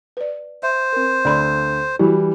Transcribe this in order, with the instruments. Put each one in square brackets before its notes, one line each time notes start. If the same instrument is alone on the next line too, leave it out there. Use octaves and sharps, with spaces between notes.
[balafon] B4 D5
[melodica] C5 [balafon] E5
[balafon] C4 A#4
[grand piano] D2 [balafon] D5 B5 C6
[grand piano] E3 G3 [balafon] E4 F#4